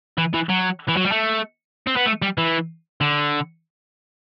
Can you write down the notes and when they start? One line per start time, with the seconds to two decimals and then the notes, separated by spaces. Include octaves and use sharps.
0.18 E3
0.34 E3
0.49 F#3
0.89 E3
0.97 F#3
1.05 G3
1.12 A3
1.87 C4
1.96 B3
2.06 A3
2.22 G3
2.38 E3
3.01 D3